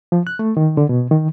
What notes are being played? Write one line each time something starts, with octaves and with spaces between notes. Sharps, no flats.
F3
F#6
A3
D#3
D3
B2
D#3